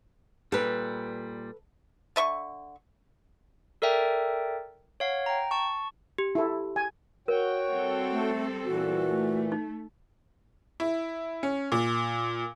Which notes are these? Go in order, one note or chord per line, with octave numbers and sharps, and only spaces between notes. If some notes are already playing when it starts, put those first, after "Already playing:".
A#2 G3 A4 B4
D3 E5 C#6
A4 A#4 D5 E5 G5
C#5 F5 F#5
G5 A#5
A5 C#6
G4
E4 A4
G#5
F#4 A#4 C#5 G5
G3 C4 A4
A3
A#2 E3 F#4
A3
D#4
E4
C#4
A#2